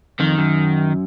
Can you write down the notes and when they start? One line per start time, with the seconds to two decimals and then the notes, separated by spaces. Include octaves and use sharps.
0.19 F2 D#3
0.38 F#2